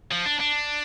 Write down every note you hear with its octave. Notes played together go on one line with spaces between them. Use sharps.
F3
D4
D4